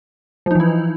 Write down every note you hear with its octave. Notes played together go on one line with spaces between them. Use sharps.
E3 F3 D#4 E4